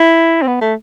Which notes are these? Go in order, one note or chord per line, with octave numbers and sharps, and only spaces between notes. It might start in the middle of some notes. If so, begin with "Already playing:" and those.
Already playing: E4
C4
B3
A3